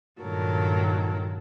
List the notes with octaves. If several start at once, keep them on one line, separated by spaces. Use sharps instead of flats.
G2 A#2 D#3 F#3 A4 A#4